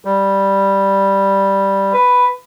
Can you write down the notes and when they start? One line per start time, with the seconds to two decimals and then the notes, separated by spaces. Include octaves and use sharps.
0.05 G3
1.93 B4